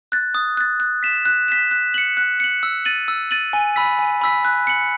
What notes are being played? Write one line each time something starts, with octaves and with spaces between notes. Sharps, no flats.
F#6 A6
D#6
F#6 A6
F#6
B6 E7
F#6
B6 E7
F#6
C#7 F#7
F#6
C#7 F#7
E6
A6 D#7 F#7
E6
A6 D#7 F#7
G#5
B5 E6 B6
G#5
B5 E6 B6
F#6
C#7 F#7